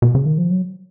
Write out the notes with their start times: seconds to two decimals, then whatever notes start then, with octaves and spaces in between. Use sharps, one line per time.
0.02 B2
0.15 C#3
0.26 D#3
0.38 F3
0.51 F#3